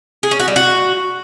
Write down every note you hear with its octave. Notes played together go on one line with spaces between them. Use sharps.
G#4
C#4
F#4
G3
F#4